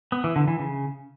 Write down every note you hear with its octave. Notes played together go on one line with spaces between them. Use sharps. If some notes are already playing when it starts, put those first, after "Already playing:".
B3
E3
D3
E3
C#3